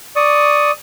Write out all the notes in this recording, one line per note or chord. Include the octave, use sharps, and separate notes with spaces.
D5 C#6 D#6